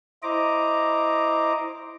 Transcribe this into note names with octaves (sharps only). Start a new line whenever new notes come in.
E4 C5 D#5 A#5 D6